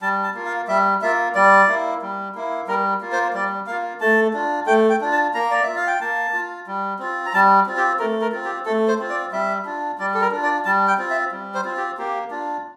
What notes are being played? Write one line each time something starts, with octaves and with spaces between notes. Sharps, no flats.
G3 A5
A5
A#3 F4
F5
G3 E5
A#3 F4 E5
G3 D5
A#3 E4
G3
A#3 E4
G3 A#4
A#3 F4
C5
G3 D5
A#3 F4 F5
A3 A5
D4 F4
A3 G5
G5
D4 F4
A5
A#3 A#5
D5
F4 E5
F5
G5
A#3 A5
F4
G3
C4 F4
A#5
G3 A5
C4 F4
G4
A3 A#4
A#4
C4 F4
G4
A3 A4
C5
C4 F4
D5
G3 E5
D4 F4
G3 D5
A4
A#4
D4 F4
D5
G3 A5
G5
C4 F4
E5
G3
C5
C4 F4
G4
A#3 G4
D4 F4